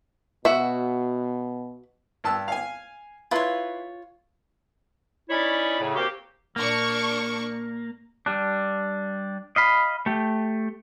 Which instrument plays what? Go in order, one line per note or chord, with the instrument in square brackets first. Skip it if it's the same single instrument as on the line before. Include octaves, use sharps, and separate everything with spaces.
[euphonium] B2 [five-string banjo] F#4 E5
[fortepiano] G2 A5 E6
F5 G#5
[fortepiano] E4 B4 C6 [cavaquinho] F4 C#5
[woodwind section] C#4 D#4 E4 C#5 D5 B5
A2 C#3
A#3 C4 F#4 G4
[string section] A#1 D4 C#6 [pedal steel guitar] A#3
[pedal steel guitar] G3 D4
D#5 F5 B5
A3 G4